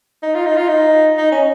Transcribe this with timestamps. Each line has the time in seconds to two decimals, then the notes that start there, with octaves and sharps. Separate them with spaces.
0.23 D#4
0.35 F4
0.46 D#4
0.56 F4
0.68 D#4
1.17 D#4
1.32 C#4